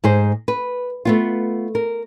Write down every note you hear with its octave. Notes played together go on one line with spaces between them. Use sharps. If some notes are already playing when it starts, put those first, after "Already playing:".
G#2 G#4 C5
B4
A3 B3 F4
A#4